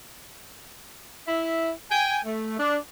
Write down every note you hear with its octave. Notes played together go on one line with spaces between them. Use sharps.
E4 E5
G5 G#5
A3
D4